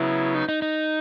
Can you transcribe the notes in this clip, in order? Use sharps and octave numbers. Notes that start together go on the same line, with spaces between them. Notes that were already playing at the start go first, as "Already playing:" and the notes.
Already playing: C#3 F#3 B3 E4
D#4
D#4
D#4